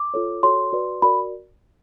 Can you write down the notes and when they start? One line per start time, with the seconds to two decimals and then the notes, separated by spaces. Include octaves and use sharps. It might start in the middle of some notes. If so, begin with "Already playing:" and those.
Already playing: D6
0.14 F4 A4 C#5
0.43 F#4 A4 C#5 C6
0.72 F#4 B4 D5
1.02 F#4 A#4 D5 B5